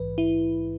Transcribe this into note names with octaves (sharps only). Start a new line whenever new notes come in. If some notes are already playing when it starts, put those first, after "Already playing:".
Already playing: A#1 G#2 E3 B4
E4